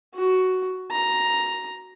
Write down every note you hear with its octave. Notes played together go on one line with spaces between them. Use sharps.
F#4
A#5